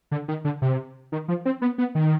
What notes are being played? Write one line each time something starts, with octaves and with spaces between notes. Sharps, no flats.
D3
D#3
D3
C3
D#3
F3
C4
B3
B3
D#3